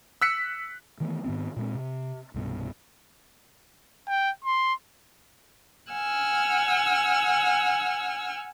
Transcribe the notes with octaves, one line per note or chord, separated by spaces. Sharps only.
E6 F#6 B6 C#7
D#3 E3 A3 B3
G#2 D#3 B3 C4
A#2 G#3 C4
C3
C2 G2 B2
G5
C6
F#5 G#5 E6 F6